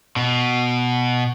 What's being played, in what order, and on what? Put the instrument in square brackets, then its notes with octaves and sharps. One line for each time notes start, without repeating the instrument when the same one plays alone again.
[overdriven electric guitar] B2